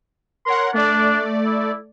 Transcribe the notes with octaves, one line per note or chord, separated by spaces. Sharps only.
A#4 C#5 F#5 C6
A3 D4 D5
E4